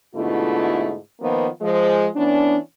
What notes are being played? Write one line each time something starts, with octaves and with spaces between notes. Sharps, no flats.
G#2 B2 D3 A3 E4 F4
D#3 F3 A#3 B3
F3 G#3 C5
E3 B3 C#4 D4